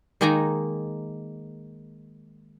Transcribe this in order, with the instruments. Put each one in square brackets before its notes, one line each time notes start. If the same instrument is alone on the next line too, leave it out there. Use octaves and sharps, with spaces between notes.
[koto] D#3 G#3 A#3 D#4 G#5 A#5